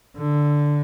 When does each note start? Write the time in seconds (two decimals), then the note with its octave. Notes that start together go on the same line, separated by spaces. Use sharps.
0.16 D3